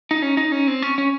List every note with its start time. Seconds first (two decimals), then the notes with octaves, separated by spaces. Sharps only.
0.11 D#4
0.22 C#4
0.37 D#4
0.52 C#4
0.68 C4
0.82 C#4
0.98 C#4